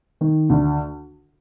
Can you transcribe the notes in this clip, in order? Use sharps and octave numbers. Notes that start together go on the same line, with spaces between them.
D#3
D2